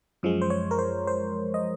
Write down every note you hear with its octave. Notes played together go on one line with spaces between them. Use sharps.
F#2 F3 G#3
C5
C#5
A#4
C5
C5
D#5